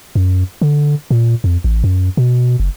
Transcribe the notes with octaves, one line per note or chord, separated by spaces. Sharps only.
F#2
D3
A#2
F2
A1
F#2
B2
F#1